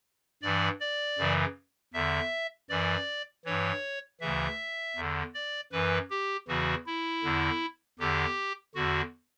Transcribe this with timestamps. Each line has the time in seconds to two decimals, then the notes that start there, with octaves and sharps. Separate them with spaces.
0.42 G2 E3 D5
0.80 D5
1.18 F#2 C#3 E3
1.94 E2 D3 E5
2.69 F#2 E3 D5
3.45 G2 E3 C#5
4.21 D2 C#3 E3 E5
4.96 E2 D3
5.34 D5
5.72 F#2 E3 B4
6.10 G4
6.48 E2 C#3 E3 F#4
6.86 E4
7.24 E2 D3
7.99 E2 D3 G4
8.75 E2 D3 F#4